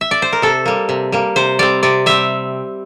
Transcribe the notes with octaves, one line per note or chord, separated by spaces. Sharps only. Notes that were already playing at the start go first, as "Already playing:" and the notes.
E5
D5
C5
A#4
C3 A4
G3 A#3
C3
G3 A#3
C3 C5
G3 C4 D5
C3 D5
G3 C4 E5